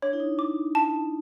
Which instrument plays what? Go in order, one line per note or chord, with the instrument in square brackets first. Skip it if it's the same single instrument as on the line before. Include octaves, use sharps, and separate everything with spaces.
[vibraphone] D4 [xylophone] C#5
[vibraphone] E4
D#4
[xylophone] D6
A5